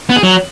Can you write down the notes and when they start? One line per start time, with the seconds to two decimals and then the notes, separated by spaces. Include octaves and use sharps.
0.09 B3
0.16 G#4
0.23 F#3